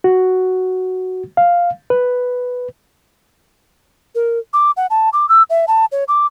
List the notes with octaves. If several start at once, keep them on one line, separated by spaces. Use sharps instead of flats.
F#4
F5
B4
A#4
D6
F#5
A5
D6
E6
E5
A5
C#5
D6